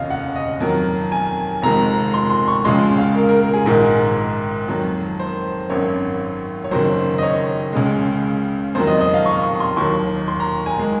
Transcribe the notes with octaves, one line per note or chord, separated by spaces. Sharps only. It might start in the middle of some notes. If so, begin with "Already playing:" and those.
Already playing: F1 D#2 C#3 C#5 D#5 F5
F#5
D#5
F2 D#3 F#3 A#4
G#5
F1 F2 D#3 G#3 A#5
C6
C6
C#6
C#2 C#3 F3 G#3 C6
F5
A#4
A#4
A#4
G#4
A#1 G#2 D#3 A#4
F2 D#3 F#3
C5
G#1 F#2 D#3 C#5
C#5
F#1 F#2 D#3 F#3 C5
D#5
C#5
C#2 C#3 G#3
F2 D#3 F#3 C5
D#5
D#5
F5
C#6
C#6
C6
D#2 D#3 F#3 C#6
C6
A#5
G#5
D#3 G#3